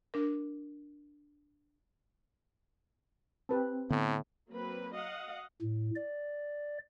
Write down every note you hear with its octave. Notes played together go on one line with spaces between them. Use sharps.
D4 A#4
C4 G4 B4 A5
A2 D3 B3
F#3 A#3 C4 B4
D#5 F5 F#5
A2
D5